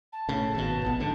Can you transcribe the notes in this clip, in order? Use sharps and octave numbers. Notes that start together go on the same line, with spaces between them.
A5
A2 C#3
G#1 B2
A#1 B3
G#2 D3